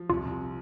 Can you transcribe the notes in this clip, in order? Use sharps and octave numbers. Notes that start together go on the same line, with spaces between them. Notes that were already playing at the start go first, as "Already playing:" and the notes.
Already playing: F3
C2 F4
C2